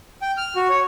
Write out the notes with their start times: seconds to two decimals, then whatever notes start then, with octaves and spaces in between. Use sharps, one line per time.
0.22 G5
0.37 F6
0.56 F#4
0.70 C#5